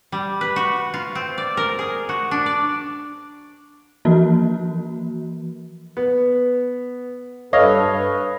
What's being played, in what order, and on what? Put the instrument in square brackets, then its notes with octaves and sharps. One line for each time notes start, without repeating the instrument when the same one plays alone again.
[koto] G3
B4
F#4
F4
C4
D5
A#4
G#4
F#4
D4
D5
[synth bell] E3 F3 A#3 F#4
[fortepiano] B3
[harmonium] G2 A4 B4 [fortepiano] C#5 D#5 F5
[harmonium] B4